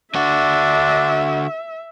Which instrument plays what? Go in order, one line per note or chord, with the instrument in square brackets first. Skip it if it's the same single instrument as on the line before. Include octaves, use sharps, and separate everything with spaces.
[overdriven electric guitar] D3 F#4 [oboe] D4 [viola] E5